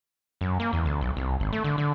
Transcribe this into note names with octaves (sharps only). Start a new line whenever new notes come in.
F#2
A#3
E2
D2
B1
C2
G#1
A3
D3
D3